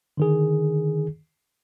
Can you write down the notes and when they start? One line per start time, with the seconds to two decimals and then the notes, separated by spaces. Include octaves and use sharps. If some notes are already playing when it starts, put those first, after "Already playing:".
0.17 D3 D#3 G#4